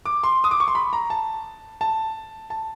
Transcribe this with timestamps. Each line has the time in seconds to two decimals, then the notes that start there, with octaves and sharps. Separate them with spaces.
0.06 D6
0.23 C6
0.44 D#6
0.51 D6
0.60 C#6
0.68 C6
0.75 B5
0.93 A#5
1.10 A5
1.81 A5
2.50 A5